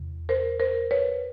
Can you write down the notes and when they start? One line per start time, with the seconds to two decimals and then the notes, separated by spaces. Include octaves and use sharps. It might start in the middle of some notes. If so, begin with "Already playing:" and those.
Already playing: E2 C3
0.29 A#4 C5
0.60 A#4 C5
0.91 B4 C#5